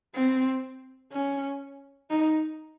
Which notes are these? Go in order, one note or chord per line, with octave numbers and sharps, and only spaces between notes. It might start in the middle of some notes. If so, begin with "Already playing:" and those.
C4
C#4
D#4